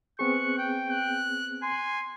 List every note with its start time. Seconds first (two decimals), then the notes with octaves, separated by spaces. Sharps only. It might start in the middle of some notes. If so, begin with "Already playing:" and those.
0.19 B3 C4 G#4 C#6 F#6
0.58 G5
0.91 F#6
1.63 G#5 C6